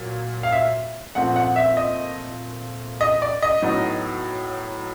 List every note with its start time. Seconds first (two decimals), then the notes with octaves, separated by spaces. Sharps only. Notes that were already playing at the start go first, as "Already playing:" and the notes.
Already playing: A#2 F#3
0.43 F5
0.52 E5
1.15 A#2 F3 A3 C4 F#5
1.36 F#5
1.56 E5
1.77 D#5
3.01 D#5
3.22 D5
3.42 D#5
3.62 A2 F#3 B3 D#4